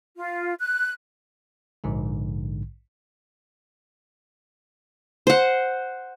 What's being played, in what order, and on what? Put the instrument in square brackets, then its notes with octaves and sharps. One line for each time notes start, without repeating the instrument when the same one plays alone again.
[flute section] F4
F#6
[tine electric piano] A#1 G#2 D3
[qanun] C5 F#5